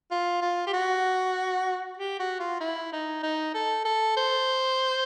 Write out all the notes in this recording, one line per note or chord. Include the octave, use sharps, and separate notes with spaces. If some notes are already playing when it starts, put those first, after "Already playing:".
F4
F4
G4
F#4
G4
F#4
F4
E4
D#4
D#4
A4
A4
C5